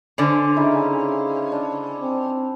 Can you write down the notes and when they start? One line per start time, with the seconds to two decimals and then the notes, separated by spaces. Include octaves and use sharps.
0.18 D3 C#4 C5 D5
0.57 C#3 D#4 E4
1.52 D4
2.01 C4